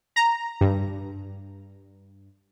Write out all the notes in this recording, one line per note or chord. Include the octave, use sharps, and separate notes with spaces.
A#5
G2